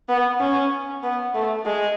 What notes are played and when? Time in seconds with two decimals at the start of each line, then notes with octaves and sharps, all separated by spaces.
0.09 B3
0.40 C#4
1.03 B3
1.34 A3
1.66 G#3